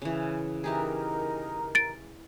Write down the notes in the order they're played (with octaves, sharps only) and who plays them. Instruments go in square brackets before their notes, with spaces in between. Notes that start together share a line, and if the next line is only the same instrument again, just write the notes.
[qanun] C#3 E3
[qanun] E3 G4 G#4 [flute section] D#4 A#4 A#5
[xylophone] A6 D7